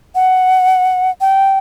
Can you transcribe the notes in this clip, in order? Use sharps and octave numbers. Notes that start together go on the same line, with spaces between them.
F#5
G5